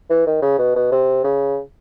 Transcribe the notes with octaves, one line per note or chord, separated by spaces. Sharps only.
E3
D#3
C#3
B2
B2
C3
C#3